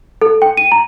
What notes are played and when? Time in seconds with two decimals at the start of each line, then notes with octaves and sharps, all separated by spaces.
0.22 A4
0.42 G5
0.57 D#7
0.72 A#5